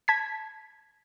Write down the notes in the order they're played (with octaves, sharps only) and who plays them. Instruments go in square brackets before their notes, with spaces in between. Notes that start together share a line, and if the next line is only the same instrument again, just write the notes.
[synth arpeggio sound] A5 G#6 B6